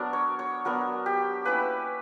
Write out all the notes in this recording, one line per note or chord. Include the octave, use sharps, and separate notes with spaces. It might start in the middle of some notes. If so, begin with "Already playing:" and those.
Already playing: F#3 B3 D4 A#4
C#5
C#5
F#3 B3 D4 A#4
G4
A#3 C#4 E4 B4